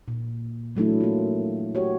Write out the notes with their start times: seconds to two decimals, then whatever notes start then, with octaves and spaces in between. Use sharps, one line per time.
0.08 A#2
0.75 E3 F#3 A3 D4 E4
1.00 A#3 F4
1.75 F#4 G4 C#5